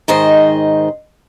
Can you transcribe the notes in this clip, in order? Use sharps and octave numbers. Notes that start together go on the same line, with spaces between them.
G#2 D#3 C5 D#5